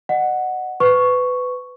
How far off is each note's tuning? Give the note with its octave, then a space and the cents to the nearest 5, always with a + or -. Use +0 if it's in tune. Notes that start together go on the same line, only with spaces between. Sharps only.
D#5 -35 F#5 +0
B4 +20 C#6 +0